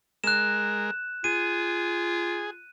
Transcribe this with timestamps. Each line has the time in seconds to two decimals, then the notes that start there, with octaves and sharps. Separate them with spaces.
0.24 G#3 A#4 F#6 E7
1.24 F4 G#4 D#7